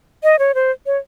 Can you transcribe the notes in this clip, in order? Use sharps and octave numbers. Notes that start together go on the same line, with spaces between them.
D#5
C#5
C5
C#5